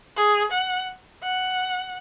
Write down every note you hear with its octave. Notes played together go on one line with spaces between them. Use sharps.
G#4
F#5
F#5